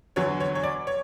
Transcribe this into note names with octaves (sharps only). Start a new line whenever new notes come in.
E2 D3 F#3 C#5
C#5
C#5
D5
C#5